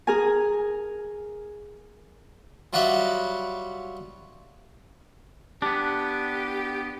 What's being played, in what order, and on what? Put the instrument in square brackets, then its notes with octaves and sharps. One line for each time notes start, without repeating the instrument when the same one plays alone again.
[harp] G#4 A#4 G#5
[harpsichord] F#3 G3 F4 F#4 D#5 E5
[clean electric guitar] B3 D4 [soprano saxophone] G4